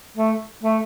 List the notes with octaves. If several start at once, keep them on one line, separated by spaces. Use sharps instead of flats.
A3
A3